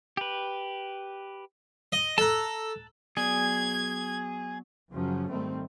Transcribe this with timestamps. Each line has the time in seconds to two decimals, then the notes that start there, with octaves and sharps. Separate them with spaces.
0.17 G4 B4
1.92 D#5
2.18 A4 A5 A#5 F#6
3.17 F#3 B3 G#4 D5 G#6
4.91 F#2 C#3 F3 F#3 C#4
5.29 G#2 D#3 G3 A3 C4